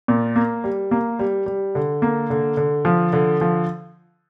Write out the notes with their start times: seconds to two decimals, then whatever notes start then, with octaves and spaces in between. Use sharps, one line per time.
0.08 A#2
0.36 A#3
0.64 G3
0.91 A#3
1.19 G3
1.46 G3
1.75 D3
2.02 A#3
2.30 D3
2.57 D3
2.85 F3
3.13 D3
3.41 F3